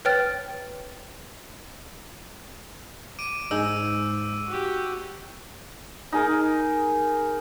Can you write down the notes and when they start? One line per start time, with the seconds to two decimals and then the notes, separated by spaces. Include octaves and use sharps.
0.05 B4 C#5 G5 F6 A6
3.19 D6 D7 D#7
3.51 G#2 D#4 G#4 E6
4.47 F#4 G4
6.12 D#4 G#4 A#4